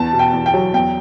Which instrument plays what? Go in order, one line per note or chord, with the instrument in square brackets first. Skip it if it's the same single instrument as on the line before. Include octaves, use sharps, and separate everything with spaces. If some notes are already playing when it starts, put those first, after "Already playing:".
Already playing: [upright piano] E2 A5
B2
G5
E2
G5
F#3
E2 G5